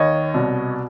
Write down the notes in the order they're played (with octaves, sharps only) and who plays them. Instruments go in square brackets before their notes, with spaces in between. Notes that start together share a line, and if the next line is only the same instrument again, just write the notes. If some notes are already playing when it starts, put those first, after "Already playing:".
Already playing: [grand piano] D#2 D#3 C#5 D#5
C2 B2